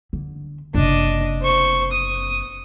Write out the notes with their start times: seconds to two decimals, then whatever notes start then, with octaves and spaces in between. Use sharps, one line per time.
0.13 D3
0.74 F#1 C3 D4 D#5
1.42 C5 C#6
1.92 D#6